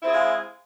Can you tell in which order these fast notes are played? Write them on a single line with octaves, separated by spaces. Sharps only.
E4 C4 G#4 G#3 F4